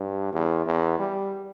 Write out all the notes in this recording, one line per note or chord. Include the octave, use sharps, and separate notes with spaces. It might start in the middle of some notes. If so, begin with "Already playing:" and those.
Already playing: G2
E2
E2
G3